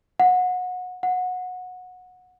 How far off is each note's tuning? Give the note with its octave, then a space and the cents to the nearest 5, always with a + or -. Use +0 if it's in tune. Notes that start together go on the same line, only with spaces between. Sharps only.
F#5 -25
F#5 -20